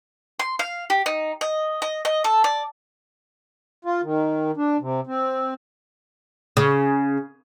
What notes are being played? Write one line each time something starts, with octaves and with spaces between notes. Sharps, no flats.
C6
F5
G4
D#4
D#5
D#5
D#5
A4
D5
F4
D#3
D4
C3
C4
C#3